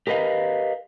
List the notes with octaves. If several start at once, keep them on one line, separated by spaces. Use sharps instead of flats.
G4 A#4 B4 D#5 F5